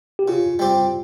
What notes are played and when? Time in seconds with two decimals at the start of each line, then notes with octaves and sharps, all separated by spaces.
0.19 G4
0.28 C#3 F4
0.59 G3 C4 G4